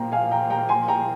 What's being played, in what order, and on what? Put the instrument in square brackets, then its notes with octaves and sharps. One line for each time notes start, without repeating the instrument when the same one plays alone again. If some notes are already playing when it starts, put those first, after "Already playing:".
Already playing: [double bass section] A#2 F3 A#3 [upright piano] G5 A#5
[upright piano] F5 G#5
G5 A#5
G5 A#5
G#5 C6
G5 A#5